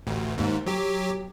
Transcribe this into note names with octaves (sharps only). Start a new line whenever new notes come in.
A1 D2
D#2 G#2
F#3 G4